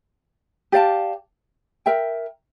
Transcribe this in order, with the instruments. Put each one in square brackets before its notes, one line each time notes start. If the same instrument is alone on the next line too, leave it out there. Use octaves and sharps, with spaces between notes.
[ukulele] G4 D5 F5 A5
A#4 E5 G5